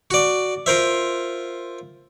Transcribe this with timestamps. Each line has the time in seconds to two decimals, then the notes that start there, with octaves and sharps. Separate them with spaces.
0.11 F#4 D5
0.66 F4 A#4 C5 E5